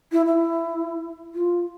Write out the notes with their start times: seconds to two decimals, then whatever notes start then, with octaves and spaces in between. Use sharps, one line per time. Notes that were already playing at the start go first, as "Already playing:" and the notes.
0.12 E4
0.26 E4
1.35 F4